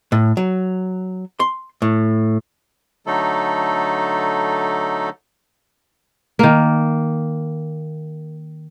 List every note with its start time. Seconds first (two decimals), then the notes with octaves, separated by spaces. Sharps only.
0.12 A2
0.37 F#3
1.40 C6
1.82 A2
3.06 D3 F#3 A3 D#4 A4
6.39 D#3 A#3